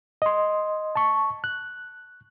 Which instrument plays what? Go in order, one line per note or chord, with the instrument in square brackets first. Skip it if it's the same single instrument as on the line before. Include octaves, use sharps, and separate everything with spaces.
[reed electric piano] D#5 C6
A5 C#6
F#6